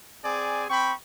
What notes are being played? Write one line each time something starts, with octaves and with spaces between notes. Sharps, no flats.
C4 G#4 D5 G#5
C4 G5 B5 C#6